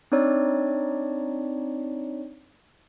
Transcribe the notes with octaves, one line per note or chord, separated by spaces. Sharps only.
C4 D4 D#4 C#5 D5